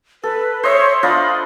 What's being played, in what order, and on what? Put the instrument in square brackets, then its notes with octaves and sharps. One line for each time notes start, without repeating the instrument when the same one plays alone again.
[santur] A4 [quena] B4
[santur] C5 D#5 E5 [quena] C#5
[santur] D4 F4 D#5 [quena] B5